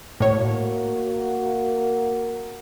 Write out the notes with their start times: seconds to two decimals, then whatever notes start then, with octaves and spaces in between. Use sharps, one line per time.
0.20 A2 A#3 F#4 C#5